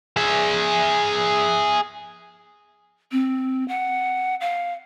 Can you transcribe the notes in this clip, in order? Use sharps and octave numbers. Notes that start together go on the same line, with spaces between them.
G#4 E5
C4
F#5
F5